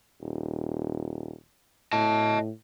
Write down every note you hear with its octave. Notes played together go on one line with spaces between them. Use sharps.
D#1
A2 D#5 A5